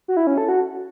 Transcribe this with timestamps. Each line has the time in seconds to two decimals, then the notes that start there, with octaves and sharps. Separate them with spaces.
0.08 F#4
0.17 E4
0.27 C#4
0.38 A4
0.49 F#4